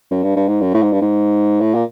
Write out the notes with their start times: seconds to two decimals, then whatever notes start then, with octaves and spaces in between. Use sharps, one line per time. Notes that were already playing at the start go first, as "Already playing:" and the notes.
0.11 F#2
0.23 G2
0.36 G2
0.48 G#2
0.61 F#2
0.74 A2
0.82 G#2
0.92 G2
1.01 G#2
1.60 A2
1.74 A#2